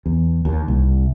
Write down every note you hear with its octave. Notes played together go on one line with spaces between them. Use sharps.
E2
D#2
C2